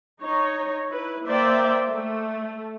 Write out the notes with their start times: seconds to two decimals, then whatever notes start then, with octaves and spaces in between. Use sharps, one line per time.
0.21 D#4 C#5
0.89 E4 B4
1.25 A#3 C5 D5 E5 G5
1.89 A3